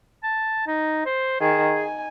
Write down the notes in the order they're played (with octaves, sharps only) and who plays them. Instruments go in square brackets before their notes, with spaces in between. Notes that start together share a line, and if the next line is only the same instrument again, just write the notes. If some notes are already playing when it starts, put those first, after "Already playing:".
[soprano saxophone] A5
D#4
C5
[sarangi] D#3 [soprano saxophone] G#4
[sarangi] G#5